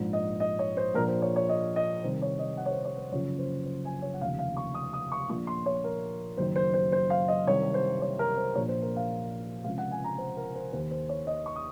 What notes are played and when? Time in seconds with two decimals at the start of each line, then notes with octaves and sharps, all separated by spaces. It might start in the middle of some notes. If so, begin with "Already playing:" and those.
Already playing: A#1 G#2 F3
0.13 D#5
0.40 D#5
0.59 C#5
0.77 C5
0.94 A#1 A#2 F3 A#4
1.08 C5
1.22 C#5
1.36 C#5
1.49 D#5
1.76 D#5
2.04 C2 C3 D#3 C5
2.22 C#5
2.39 D#5
2.57 F#5
2.66 C#5
2.71 C5
2.85 C#5
2.98 C5
3.11 F#1 F#2 C#3 F3 C#5
3.39 C5
3.66 C5
3.85 G#5
4.02 C#5
4.13 F#5
4.21 F1 D#2 C#3 F3 F5
4.39 F5
4.57 C#6
4.74 D#6
4.93 D#6
5.12 C#6
5.29 A#1 A#2 F3 C#6
5.47 C6
5.66 C#5
5.84 A#4
6.37 F#1 F#2 D#3 C5
6.56 C5
6.74 C5
6.92 C5
7.10 F5
7.28 D#5
7.47 C2 C3 D#3 C#5
7.74 C5
8.02 C#5
8.19 A#4
8.37 C5
8.55 A#1 A#2 F3 C#5
8.68 C5
8.82 A#4
8.96 F5
9.64 C#2 C3 F3 F5
9.78 F#5
9.91 G#5
10.04 A#5
10.18 C5
10.37 A#4
10.55 C5
10.73 D#2 D#3 C5
10.91 C5
11.09 C#5
11.27 D#5
11.46 C#6
11.56 D#6